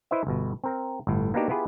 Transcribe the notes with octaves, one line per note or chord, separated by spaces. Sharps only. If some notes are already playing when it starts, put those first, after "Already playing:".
E4 B4 C5 D#5 E5
G1 B2
C4 A#4 A#5
G1 A2
A#3 B3 D4 D#4 F#4 G4
B3 E4 F4 G4 G#4 B4